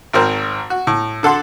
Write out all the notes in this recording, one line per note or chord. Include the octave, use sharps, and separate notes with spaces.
G#1 G#2 C4 A#4 C5
F#4
A2
D3 A4 F#5 C6